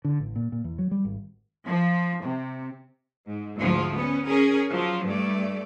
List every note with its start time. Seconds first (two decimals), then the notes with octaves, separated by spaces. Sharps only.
0.05 D3
0.20 A1
0.36 A#2
0.52 A#2
0.64 E2
0.79 F#3
0.91 G3
1.05 G#1
1.66 F3
2.22 C3
3.27 G#2
3.57 D2 G#2 F3
3.97 B3 C#4
4.28 C#4 G#4 A#4
4.72 F3 F#3
5.07 G2 A3 D5